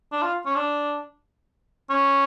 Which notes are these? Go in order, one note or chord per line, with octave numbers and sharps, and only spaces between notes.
D4
F4
C#4
D4
C#4